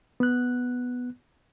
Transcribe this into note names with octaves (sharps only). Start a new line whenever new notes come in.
B3 F#6